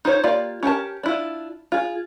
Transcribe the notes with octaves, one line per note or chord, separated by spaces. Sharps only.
D#4 F4 C5 C#5
A#3 F4 G4 D5 F5
C#4 G4 A#4 A5
D4 E4 F4
F4 G#4